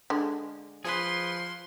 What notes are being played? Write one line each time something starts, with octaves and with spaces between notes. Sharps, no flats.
D3 G#3
F3 G#4 B4 C6